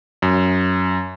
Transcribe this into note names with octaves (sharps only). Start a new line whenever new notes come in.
F#2